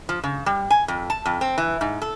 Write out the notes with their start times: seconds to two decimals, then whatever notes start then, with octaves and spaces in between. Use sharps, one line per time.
0.09 F3
0.24 C#3
0.46 G3
0.70 G#5
0.88 F2
1.10 A5
1.25 F2
1.41 C4
1.58 E3
1.81 G#2
2.02 A4